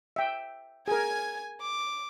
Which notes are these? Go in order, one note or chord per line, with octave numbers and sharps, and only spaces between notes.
E5 G5
G#4 A#4 G#5 G#6
D6